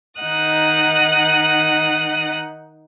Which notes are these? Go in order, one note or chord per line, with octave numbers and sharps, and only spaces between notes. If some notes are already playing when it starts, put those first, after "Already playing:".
D#3 D#4 F#5 D#6 F#6